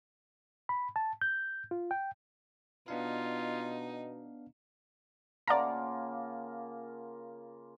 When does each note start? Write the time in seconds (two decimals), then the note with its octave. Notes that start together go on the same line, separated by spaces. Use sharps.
0.69 B5
0.96 A5
1.22 G6
1.71 F4
1.91 G5
2.88 B2 B3 D4 D#4 F4 F5
5.47 C#3 A#3 F4 D5 F#5 A5 A#5